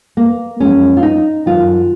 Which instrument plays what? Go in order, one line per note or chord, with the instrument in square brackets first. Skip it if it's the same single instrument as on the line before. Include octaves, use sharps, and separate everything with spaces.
[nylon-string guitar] A#3
F#2 F3 G#3 C#4
F4
D#4
F#2 D#3 F#3 F4